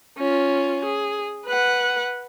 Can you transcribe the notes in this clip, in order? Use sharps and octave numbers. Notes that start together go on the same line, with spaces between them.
C#4 F4
G#4
B4 F#5